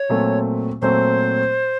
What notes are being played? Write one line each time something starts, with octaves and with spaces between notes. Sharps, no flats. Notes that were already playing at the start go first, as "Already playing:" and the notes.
Already playing: C#5
A#2 F#3 A3 C4
A#2 F#3 A3 C4 C5